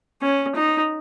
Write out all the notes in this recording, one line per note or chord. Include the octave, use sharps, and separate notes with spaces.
C#4
D#4